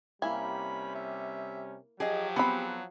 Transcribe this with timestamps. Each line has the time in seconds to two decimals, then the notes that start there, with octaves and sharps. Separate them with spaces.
0.22 C3 G3 A#3 C#4 E4 G#5 B5
0.95 E5
2.00 F3 F#3 G4 G#4 D#5
2.36 B3 C4 G#4 B5